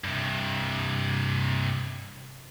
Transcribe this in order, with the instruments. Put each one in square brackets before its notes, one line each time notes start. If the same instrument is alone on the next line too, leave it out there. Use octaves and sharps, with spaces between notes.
[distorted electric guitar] G2 C3